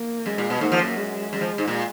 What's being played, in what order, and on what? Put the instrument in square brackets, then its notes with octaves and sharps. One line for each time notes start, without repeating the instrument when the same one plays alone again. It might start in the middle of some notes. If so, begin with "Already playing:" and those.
Already playing: [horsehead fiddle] A#3
[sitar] F#2 [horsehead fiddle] G#3
[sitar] A#2
B2
[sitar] G#2 [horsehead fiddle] A#3
[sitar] F3
F#2
[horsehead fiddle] G#3
[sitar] F#2
F3
G#2
A#2